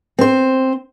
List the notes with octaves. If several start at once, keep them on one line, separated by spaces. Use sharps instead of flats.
C4 C5